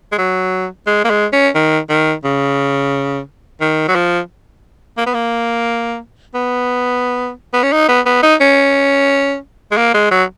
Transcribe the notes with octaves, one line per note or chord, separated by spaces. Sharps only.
G#3
F#3
G#3
A#3
G#3
C#4
D#3
D#3
C#3
D#3
F#3
F3
A#3
B3
A#3
B3
B3
C#4
D#4
B3
B3
D#4
C#4
G#3
A#3
G#3
F#3